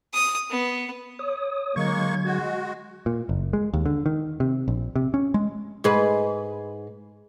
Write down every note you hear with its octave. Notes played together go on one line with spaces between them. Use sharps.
D#6
B3
C#5 D#6
D3 F#3 G#3 A#3 C#6 G#6
G#3 F#4
A#2
F#1
G#3
D#2
D3
D#3
C3
A#1
C3
C#4
G#3
G#2 G#4 B4